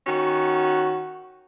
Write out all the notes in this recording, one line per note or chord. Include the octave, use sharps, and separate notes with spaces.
D#3 C#4 F#4